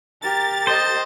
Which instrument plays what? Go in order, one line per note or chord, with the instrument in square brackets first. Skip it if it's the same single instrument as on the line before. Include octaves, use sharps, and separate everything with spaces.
[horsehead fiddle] G4 A#4 [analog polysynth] A6
[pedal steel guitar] C5 [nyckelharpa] D#5